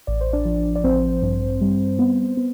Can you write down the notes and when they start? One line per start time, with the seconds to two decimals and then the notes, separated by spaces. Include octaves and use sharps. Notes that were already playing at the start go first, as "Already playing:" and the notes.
0.07 A1 D5
0.21 C5
0.33 D4 D5
0.45 F3
0.76 D5
0.84 A1 C4 C5
1.22 G2
1.61 G3
1.99 B3
2.37 B3